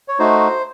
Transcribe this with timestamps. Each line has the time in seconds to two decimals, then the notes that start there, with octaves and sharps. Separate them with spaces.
0.08 C#5
0.19 A3 D#4 F#4 C5